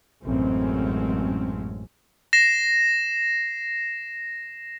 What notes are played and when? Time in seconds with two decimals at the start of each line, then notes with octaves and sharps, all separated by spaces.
0.25 A1 F#2 G#3 C4 C#4
2.33 A#6 C7 E7